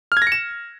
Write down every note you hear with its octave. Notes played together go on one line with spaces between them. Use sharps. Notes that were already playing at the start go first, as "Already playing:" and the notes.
F6
G#6
A#6
C#7
E7